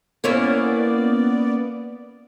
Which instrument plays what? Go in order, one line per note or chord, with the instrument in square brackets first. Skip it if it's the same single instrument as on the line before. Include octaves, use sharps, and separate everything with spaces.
[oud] A#3 C#4 E4 [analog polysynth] B3 D5